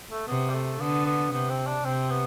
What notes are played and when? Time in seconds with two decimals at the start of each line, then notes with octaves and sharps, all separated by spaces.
0.11 A3
0.27 C3 B3
0.49 G3
0.54 A3
0.80 D3 B3
1.06 B3
1.32 C3 B3
1.50 C4
1.67 D4
1.84 C3 C4
2.10 B3